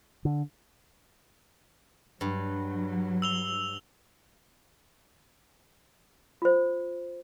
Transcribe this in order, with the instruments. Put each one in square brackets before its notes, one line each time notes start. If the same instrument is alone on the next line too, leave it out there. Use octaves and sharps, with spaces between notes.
[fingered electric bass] D3
[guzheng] G2 [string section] F#3
[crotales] E6 F7 G7
[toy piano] F4 C5